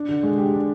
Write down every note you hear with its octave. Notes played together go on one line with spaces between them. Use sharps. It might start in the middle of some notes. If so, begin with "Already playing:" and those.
Already playing: D4
D3
G#3
G4
D4